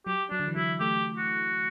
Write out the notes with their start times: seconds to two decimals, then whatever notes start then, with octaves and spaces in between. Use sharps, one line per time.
0.07 F#3 G4
0.31 F#3 D4
0.40 D3
0.48 E3
0.56 F#3 E4
0.80 A3 G4
1.18 F#4